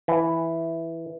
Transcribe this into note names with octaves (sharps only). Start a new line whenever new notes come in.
E3